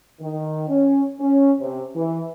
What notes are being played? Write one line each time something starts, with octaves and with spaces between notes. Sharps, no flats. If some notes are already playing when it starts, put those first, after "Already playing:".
D#3
C#4
C#4
C3
E3